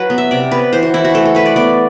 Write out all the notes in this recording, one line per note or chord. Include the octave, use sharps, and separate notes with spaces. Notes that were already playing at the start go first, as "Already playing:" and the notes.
Already playing: F#3 B4
B3
E5
C3 D5
B3 B4
E3 C5
F#4
E3 E4
F#4
A3 A4
A4
A3 B4
D5
B3 D5